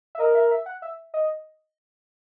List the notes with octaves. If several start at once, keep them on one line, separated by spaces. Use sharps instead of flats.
E5
A#4 D#5
E5
E5
F#5
E5
D#5